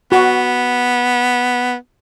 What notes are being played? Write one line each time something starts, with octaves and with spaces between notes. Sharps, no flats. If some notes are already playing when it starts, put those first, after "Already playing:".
B3 F#4